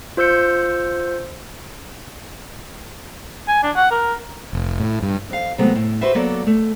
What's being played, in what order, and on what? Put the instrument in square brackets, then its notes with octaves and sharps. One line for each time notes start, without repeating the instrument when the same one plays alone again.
[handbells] F4 C5 E6 G6 C#7
[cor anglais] G#5
D4
F#5
A#4
[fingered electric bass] F1
A2
G2
[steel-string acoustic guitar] F2 F5
C3 F#3 G#3 A3 B3
A2
F#4 G4 B4 C5 E5
F#3 A#3 B3 F#4 A4 D5
A3